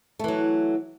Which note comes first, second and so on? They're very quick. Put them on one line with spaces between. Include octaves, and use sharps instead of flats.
A3 E3 F#3